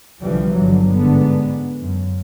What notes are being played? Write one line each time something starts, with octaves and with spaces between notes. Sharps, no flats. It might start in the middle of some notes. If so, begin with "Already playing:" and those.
C2 D3 E3 F3 G3
G1 D3 F#3
G#2 D3 B3
F#2